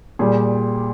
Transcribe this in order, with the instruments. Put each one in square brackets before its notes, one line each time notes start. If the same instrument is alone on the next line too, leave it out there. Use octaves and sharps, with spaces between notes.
[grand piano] A#2 G3 G#4